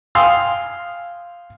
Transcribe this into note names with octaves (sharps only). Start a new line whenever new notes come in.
F5 G5 G#5 C6 D#6 E6